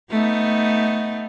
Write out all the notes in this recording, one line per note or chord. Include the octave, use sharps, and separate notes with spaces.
A3 B3 D#4